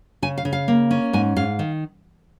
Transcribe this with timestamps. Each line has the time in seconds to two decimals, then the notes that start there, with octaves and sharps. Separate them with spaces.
0.22 C#3 G#5
0.38 F5
0.45 C#3
0.53 F5
0.68 A#3
0.91 C#4
1.13 G#2 G#5
1.36 G#2 F5
1.59 D#3